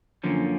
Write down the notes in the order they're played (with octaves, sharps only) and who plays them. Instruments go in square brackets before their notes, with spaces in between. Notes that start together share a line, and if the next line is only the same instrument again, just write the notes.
[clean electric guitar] F#2 D3 F3 A#3 C#4